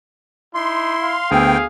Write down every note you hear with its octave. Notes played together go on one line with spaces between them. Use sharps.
D#4 E4 C6
F5
D2 B3 G#4 G5 E6